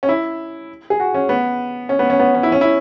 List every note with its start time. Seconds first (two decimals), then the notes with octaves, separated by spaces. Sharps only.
0.03 C#4
0.09 E4
0.90 G#4
1.00 F#4
1.14 C#4
1.29 B3
1.89 C#4
1.99 B3
2.10 C#4
2.19 B3
2.35 C#4
2.43 E4
2.52 C#4
2.61 E4